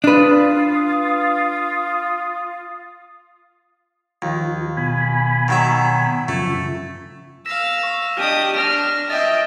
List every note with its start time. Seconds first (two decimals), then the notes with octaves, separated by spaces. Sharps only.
0.04 D4 F4 B4 F5 D#6
4.22 D#2 F3
4.77 B2 G#5 B5
5.48 D#3 F#3 E5
6.28 F#2 C#3 F3 A3
7.46 F5 E6 A#6 B6 E7
7.83 C#6
8.17 D4 G4 D#5 D#6 F6 D#7
8.55 D4 F6 A#6 D7
9.10 D#5 E5 G5 A6